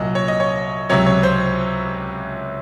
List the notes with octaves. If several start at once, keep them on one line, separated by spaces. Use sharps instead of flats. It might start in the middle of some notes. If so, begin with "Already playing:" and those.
Already playing: C2 A#2 F#3 D#5
C#5
D#5
C#5
C#2 C3 F#3 C#5
C#5
C5